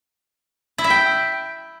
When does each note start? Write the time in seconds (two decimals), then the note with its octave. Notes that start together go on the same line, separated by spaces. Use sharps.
0.78 E4
0.84 E5
0.90 G5